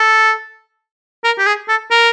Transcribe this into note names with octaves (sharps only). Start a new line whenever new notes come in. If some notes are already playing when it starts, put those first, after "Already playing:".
Already playing: A4
A#4
G4
G#4
A4
A#4